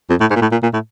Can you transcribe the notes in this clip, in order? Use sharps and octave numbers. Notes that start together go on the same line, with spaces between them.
F2
A2
G#2
A#2
A2
A#2
A#2
A2